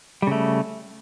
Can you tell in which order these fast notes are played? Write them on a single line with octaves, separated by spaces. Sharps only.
G3 C#3 A3